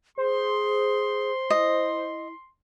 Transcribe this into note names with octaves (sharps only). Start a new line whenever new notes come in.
G#4 C5 C6
E4 D#5